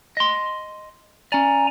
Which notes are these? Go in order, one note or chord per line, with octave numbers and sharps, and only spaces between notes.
D#5 C6
C#4 D5 G#5 A#5